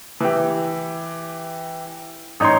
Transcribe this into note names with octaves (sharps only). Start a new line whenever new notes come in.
E3 G4
A1 D#4 C#5 C6